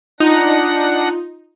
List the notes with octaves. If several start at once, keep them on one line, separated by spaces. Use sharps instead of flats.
D4 D#4 F4 F#5 A#6